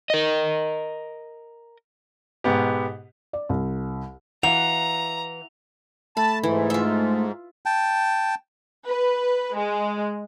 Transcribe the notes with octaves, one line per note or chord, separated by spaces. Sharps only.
A#4 D#5
G#2 B2 B3 G4
D5
C2
E3 F5 F#5 A#5 F7
A3 A5 B5
G#2 E3
F4 E5
G5 A5
B4
G#3